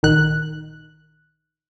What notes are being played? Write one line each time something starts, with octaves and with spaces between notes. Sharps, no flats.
A#1 D#3 F#6